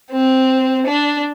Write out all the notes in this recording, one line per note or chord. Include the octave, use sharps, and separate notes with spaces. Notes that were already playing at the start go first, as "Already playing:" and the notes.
C4
D4